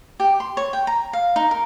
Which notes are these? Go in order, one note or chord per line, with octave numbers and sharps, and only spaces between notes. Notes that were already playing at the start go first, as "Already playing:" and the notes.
G4
C6
C#5
G5
A#5
F5
D#4
A#4